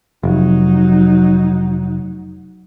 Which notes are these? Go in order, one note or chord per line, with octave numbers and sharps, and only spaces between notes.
F1 F#3 D#4